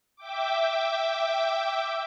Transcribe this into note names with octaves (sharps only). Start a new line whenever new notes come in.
E5 G5 D6